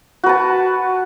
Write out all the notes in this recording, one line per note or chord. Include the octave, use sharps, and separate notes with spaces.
F#4 B4 A5